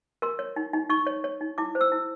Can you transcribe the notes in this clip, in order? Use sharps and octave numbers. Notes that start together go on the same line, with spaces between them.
A#4 C6
C#5
D#4
D#4
D#4 C#6
C#5
C#5
D#4
E4 D6
C5
E6
E4